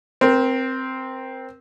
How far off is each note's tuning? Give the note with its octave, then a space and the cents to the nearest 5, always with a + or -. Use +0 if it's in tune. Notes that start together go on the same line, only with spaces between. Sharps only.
C4 +0 A#4 +30